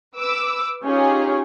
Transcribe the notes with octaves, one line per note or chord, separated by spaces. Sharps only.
B4 D6 E6
C#4 D#4 F4 G4 G#4 C#5